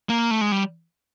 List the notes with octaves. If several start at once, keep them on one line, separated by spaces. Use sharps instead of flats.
A#3
A3
G#3
G3